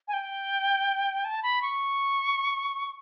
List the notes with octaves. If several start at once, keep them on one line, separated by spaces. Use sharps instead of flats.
G#5
G5
A5
B5
C#6